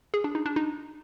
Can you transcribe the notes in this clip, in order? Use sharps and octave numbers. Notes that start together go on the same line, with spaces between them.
G#4
D4
D#4
D4
D#4